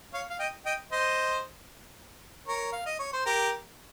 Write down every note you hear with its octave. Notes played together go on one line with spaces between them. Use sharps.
C#5 F5
F5
D#5 G5
D#5 G5
C5 D#5
A#4 C#5
F5
D#5
C#5
C5
G4 A#4